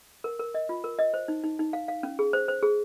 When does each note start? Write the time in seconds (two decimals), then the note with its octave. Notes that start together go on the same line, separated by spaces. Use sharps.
0.24 A#4
0.39 A#4
0.54 D#5
0.69 F4
0.84 A#4
0.99 D#5
1.14 C5
1.28 D#4
1.44 D#4
1.59 D#4
1.73 F5
1.88 F5
2.03 C#4
2.19 G#4
2.33 C5
2.48 C5
2.63 G#4